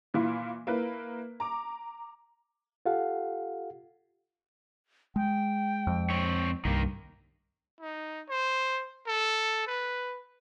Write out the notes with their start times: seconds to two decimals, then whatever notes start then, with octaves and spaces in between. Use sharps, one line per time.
0.14 A#2 E3 E4 F4
0.67 A#3 E4 B4
1.40 A#5 D6
2.86 F4 G4 A4 F5 F#5
5.16 G#3 G5
5.87 F2
6.10 C4 C#5
6.65 C2 G2 D#3 A#3
7.80 D#4
8.29 C5
9.07 A4
9.67 B4